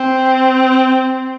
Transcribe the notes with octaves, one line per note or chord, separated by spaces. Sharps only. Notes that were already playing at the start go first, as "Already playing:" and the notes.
Already playing: C4